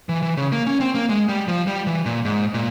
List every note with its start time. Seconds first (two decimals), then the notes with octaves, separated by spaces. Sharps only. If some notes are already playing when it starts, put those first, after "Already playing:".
0.09 E3
0.23 E3
0.37 C#3
0.52 A#3
0.66 C#4
0.80 C4
0.95 A#3
1.09 G#3
1.29 G3
1.48 F3
1.67 G3
1.87 E3
2.06 A#2
2.25 G#2
2.54 A#2